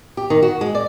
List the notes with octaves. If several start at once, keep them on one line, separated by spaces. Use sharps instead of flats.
G4
D#3
F#4
G#3
D5